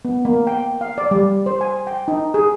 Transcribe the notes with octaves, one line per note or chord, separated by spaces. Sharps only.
B3
A#3
G5
F5
D5
G3
C5
G#5
G5
D#4
G#4